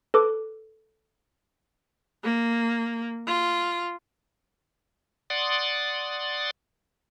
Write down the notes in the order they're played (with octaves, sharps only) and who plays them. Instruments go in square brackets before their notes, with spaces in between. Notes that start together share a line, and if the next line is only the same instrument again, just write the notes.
[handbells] A4 B4 D6
[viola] A#3
F4
[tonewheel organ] D5 F#5 C6 D#6 A6